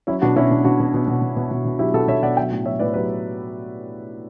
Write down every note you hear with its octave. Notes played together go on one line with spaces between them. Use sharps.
F#3 C#4 E4
B2 D4 F#4
B2 C#4 E4
B2 D4
B2 D4 F#4
B2
B2
B2
B2
B2
B2
B2
F#3 E4 G4
B2 F#4 A4
B2 C#5 E5
B2 D5 F#5
F#3 E5 G5
A2
F#3 C#5 E5
A2 B4 D5
F#3 G4 B4